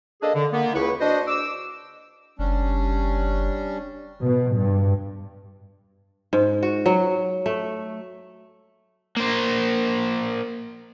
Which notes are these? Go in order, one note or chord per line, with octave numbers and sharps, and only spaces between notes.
A#3 D4 G#4 A4 D#5
D3
A#3 B3
C#2 E4 B4 C#6
D4 F#4 C5 D#5
D6 E6
F#1 G3 C#4 D4
B2
G2
G#2
F#4
F#3
A3
A#3 C5